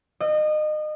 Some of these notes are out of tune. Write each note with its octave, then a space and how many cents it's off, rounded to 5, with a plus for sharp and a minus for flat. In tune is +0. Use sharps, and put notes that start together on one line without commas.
D#5 -30